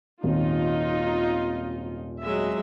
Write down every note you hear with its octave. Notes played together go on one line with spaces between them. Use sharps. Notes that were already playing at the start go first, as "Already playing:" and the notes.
D#1 G#1 D#4 F4
F#3 G#3 E5